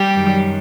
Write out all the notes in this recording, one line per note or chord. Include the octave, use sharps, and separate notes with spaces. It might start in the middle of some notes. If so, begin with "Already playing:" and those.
Already playing: G3 G4
F#2 D#3 F#3